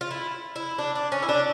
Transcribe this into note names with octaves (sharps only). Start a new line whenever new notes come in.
F4
E4
E4
D4
D4
C#4
E4
D4